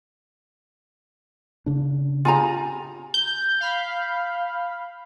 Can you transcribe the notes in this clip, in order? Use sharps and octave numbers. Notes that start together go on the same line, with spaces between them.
C#3 D4
F4 G4 G#4 G#5 A#5
G6
F5 B5